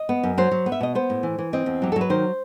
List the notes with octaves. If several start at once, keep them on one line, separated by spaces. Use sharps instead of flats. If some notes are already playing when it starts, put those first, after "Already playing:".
Already playing: D#5
B3
F#2
F#3 C5
F#3
B3
E5
B2 D#5
B3 C5
A2
E3
E3
C4 D#5
E2
F#3 G4
A4
F#3 B4
D#3 C5